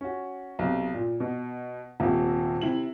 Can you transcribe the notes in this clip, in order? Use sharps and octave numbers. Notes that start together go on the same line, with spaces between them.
C#4 F#4
B1 C3
A#2
B2
D#1 C3 A#3 E5
C3 E4 F#7